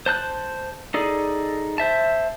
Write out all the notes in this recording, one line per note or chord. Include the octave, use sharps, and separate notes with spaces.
C5 A5 F#6 G6
D#4 G#4 A4 D5
C5 E5 A5